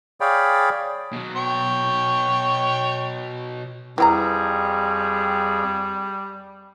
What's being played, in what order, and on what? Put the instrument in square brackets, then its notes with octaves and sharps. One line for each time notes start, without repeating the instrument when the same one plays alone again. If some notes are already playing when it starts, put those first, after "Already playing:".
[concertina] G#4 C#5 D5 F5 G5 B5
[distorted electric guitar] B2 F#3
[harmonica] C#5 G5
[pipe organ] F2 G#4 [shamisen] E3 G4 A#5 [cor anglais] G3